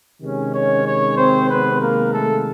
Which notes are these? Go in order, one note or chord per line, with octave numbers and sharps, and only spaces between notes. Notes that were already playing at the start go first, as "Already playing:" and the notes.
C3 D#3 G#3 C#4
C#4 C#5
C#4 C#5
C4 C5
B3 B4
A#3 A#4
A3 A4